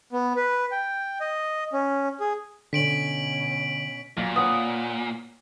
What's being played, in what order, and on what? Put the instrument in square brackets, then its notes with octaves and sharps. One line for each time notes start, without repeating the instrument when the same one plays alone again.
[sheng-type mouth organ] B3
B4
G5
D#5
C#4
G#4
[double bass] B2 C#4 [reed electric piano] D3 [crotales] B6 D7 F#7
[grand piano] B1 [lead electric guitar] A#2
[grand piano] B4 C#5 F#5 [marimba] D#6